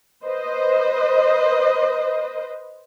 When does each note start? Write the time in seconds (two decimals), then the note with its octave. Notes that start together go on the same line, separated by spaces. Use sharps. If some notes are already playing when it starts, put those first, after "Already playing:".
0.25 B4 C5 D#5